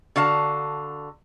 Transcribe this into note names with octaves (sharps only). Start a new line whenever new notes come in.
D3 F#4 F5 A5